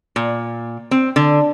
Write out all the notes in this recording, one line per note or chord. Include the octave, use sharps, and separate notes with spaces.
A#2
C4
D3